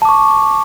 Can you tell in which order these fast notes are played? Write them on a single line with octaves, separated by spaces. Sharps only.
A5 D6 C#6